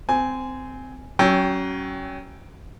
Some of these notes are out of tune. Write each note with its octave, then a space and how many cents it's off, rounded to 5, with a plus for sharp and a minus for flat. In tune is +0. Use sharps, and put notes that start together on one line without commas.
C4 -20 G#5 +0
F#3 +25 C#4 +0 G5 +0